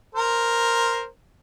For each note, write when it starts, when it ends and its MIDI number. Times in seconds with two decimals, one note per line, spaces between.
0.15 1.05 70
0.15 1.05 72